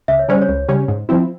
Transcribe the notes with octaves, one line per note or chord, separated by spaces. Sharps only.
C#2 E5
C#5
C#3 G3 C#4 C5
C#5
C#2
C#3 G3 C#4
G#2
F3 C4 E4